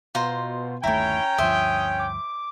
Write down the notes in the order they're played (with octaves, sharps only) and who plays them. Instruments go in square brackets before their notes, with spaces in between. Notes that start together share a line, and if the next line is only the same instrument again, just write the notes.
[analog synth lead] B2 [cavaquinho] F4 C5 A#5
[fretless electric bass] G1 D#2 A3 [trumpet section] C#4 G5 [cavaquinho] E4 C#5 [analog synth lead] A#5
[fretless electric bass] D2 G2 F3 [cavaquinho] C5 E5 [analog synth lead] D#6
[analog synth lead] D6